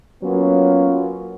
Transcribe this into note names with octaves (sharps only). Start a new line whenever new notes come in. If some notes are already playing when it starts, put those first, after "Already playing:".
F#3 A#3 B3 C#4 F4